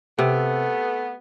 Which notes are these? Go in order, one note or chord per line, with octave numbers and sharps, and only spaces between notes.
C3 A3 B3